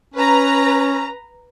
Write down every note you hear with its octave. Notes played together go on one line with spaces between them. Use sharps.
C#4 B4 A#5